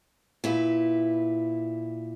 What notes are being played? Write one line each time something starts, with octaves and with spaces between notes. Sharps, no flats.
A#2 E4 B4